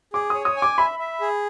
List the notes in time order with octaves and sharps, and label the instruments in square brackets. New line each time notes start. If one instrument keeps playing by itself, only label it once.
[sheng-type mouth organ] G#4 [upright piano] D6
[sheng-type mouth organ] C#5 [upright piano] D#6
[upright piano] D#6
[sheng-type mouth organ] G#5
[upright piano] D6
[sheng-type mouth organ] E5 [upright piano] B5
[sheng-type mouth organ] E5
G#4